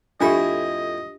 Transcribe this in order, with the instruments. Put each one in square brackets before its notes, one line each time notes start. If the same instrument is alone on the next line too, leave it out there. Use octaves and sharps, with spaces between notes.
[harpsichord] F2 A2 E5 [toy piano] D4 F4 G4 [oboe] D#5